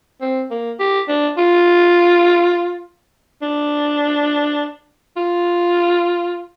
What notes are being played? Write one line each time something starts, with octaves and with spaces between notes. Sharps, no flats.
C4
A#3
G4
D4
F4
D4
F4